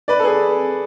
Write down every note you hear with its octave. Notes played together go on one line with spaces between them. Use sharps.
B4 D5
A4
G#4 B4